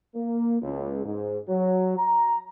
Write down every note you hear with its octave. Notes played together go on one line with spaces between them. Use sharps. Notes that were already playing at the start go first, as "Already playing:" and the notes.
A#3
C#2
G#2
F#3
A#5